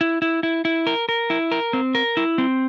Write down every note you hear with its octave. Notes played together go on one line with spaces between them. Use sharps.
E4
E4
E4
E4
A#4
A#4
E4
A#4
C4
A#4
E4
C4